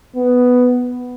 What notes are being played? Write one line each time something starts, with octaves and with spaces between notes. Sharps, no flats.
B3